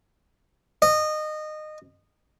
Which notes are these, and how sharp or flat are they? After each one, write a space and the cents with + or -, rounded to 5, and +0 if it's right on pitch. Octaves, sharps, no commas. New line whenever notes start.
D#5 -20